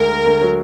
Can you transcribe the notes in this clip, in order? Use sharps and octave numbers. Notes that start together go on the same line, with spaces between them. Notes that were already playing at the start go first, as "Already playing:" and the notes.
Already playing: D2 G#3 A#4
D3
D2
F#3